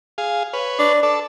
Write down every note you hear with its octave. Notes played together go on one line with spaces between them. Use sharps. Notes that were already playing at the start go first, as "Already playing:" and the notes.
G#4 F5
B4 C#5
D4
A4 D5